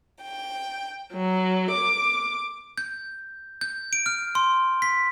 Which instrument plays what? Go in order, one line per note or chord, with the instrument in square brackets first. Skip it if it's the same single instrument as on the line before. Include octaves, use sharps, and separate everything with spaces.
[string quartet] G5
F#3
D6
[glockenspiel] G6
G6
D7
F6
C6
B6